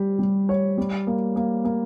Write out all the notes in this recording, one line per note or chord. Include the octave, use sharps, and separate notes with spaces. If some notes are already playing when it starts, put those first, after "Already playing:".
Already playing: G3 G4
G3
C#5
G3
A#3
A#3
A#3